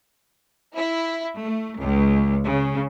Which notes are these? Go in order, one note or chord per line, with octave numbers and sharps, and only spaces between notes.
E4
A3
C#2
C#3